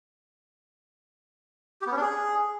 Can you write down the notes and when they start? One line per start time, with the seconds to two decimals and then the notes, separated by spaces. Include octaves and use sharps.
1.81 G4
1.87 B3
1.92 C#4
1.97 D4
2.02 G#4